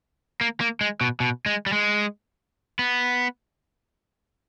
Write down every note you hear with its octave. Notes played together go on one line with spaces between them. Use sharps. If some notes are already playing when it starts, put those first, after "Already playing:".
A#3
A#3
G#3
B2
B2
G#3
G3
G#3
B3